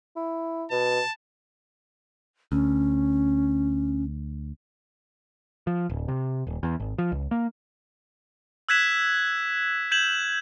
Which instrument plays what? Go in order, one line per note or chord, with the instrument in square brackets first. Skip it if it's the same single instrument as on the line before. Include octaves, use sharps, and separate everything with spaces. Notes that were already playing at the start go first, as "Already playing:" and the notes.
[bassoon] E4
[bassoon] B2 [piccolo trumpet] A5
[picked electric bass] D2 [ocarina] C#4
[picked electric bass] F3
D1
C3
D#1
E2
G#1
F3
C#2
A#3
[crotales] E6 F#6 G#6 B6 E7
G6 G#6 E7 F#7